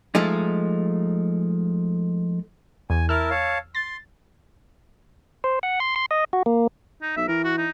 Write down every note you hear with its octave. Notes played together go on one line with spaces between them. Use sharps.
F3 G#3 A3 D#4
E2 G#5
E4 A#4 A5 E6 F6
C#5 F5 A5
C6 A6
C5
F#5
C6
C6
D#5
F#4
A#3
D#4
B1 E5
E3 A#4
F#4
D#4